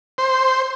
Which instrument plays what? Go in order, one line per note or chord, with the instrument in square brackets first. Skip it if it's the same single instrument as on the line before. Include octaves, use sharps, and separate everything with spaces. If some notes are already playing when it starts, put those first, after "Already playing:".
[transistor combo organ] C5